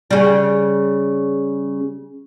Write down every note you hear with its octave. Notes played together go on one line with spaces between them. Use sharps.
C#3 G3